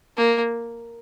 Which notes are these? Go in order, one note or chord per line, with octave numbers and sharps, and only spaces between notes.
A#3